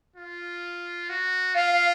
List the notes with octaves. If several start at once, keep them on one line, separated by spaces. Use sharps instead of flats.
F4
F#4
F4 F5
F5